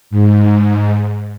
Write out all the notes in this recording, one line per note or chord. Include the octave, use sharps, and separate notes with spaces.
G#2